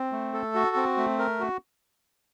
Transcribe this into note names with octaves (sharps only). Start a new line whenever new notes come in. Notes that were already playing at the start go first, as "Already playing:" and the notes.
Already playing: C4
A3
A4
F#4
C4
A3
A#4
F#4